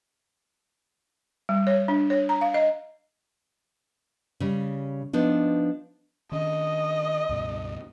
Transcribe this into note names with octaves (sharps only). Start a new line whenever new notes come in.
G3
C#5
D4
C#5
A#5
F5
D#5
C#3 G3
F3 B3 D4 D#4
D#3 C#4 D4 D#5
C#2 G2 B2